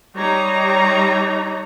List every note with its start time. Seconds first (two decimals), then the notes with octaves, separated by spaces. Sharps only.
0.16 G3 D#4 C#5 A#5